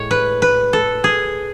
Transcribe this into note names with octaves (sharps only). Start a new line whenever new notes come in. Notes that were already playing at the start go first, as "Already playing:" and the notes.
Already playing: A2 G#3 C#5
B4
B4
A4
G#4